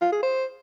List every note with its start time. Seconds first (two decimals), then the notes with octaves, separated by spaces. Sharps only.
0.01 F4
0.12 G#4
0.23 C5